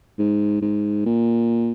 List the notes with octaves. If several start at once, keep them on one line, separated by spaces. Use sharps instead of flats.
G#2
G#2
A#2